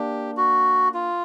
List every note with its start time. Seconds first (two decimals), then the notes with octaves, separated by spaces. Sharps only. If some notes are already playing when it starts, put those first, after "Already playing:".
Already playing: A#3 D4 G4
0.37 F#4
0.94 F4